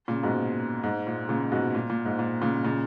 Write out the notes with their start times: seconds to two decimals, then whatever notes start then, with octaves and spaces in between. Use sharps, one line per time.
0.08 A#2 C#3
0.23 G#2 B2
0.83 G#2
1.07 A#2
1.29 A#2 C#3
1.52 G#2 B2
1.75 A#2
1.90 A#2
2.05 G#2
2.19 A#2
2.42 A#2 C#3
2.65 A#2 C#3